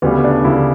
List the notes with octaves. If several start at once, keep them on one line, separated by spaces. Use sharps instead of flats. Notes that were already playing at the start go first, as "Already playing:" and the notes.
D2 C#3 G3 B3
D4
D2 C#3 G3 E4